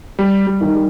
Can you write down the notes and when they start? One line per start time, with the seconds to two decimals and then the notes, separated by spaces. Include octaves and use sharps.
0.19 G3
0.47 G3
0.61 D#3
0.75 G3